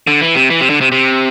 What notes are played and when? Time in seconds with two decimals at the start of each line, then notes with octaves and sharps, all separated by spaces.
0.07 D3
0.21 E3
0.35 C3
0.50 E3
0.61 C3
0.70 D3
0.81 C3
0.92 C3